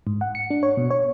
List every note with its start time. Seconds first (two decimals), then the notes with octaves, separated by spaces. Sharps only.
0.07 G#2
0.21 F#5
0.35 C#7
0.50 D4
0.63 C#5
0.77 B2
0.91 C#5